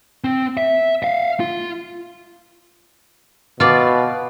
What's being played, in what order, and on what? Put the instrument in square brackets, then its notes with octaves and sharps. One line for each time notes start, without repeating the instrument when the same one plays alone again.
[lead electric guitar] C4
E5
E5 F5
F4
[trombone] B2 [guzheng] F4 D5